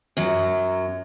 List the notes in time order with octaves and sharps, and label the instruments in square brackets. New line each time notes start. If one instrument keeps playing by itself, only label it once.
[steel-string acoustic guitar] F#2 F#3